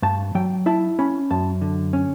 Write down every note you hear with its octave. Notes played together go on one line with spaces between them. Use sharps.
G2 A5
F#3 G5
E4 A5
C#4 B5
F#2 A5
D3
C#4